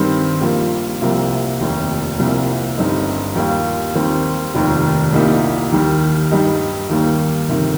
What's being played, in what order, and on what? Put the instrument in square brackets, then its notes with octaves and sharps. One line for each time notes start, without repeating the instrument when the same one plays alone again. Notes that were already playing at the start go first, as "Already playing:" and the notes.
Already playing: [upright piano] G2 D#3 G3 C4
A#1 A#2 G3 A#3
C2 C3 F3 A#3
F1 D#2 D#3
C2 C3 F3 A#3
G1 G2 G3 C4 D#4
D#2 D#3 G3 A#3 F4
D#2 D#3 G3 C4
F1 D#2 D#3
C2 A#2 G3 A#3 D#4
D#2 D#3 G3
G2 G3 D#4 G4
D#2 D#3 G3 A#3
G1 F2 C3 D#3